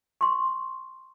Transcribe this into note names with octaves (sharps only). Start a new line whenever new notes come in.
C6 C#6